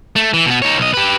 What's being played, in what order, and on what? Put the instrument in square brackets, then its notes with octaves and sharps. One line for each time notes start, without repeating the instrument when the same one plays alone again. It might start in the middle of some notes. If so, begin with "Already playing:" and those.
[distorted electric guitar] A3
E3
B2 B3
D#4 C#5
B1 D#5
G4 B4